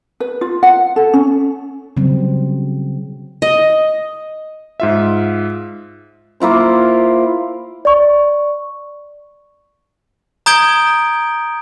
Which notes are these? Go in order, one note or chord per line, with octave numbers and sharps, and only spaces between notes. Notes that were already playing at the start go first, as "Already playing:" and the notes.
B4
F4
F#5
A4
C#4
C#3 F#3 G3 C4
D#5
G#2 F4 E5
A#3 E4 F4 C5
D5 C#6
A#5 D#6 G6 G#6 D7 G7